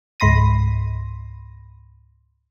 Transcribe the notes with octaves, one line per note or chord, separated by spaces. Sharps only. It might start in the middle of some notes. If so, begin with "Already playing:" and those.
C#2 G#2 B5 C6 A#6 D#7